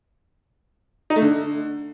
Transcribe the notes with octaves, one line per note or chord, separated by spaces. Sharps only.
D#4
A3
D3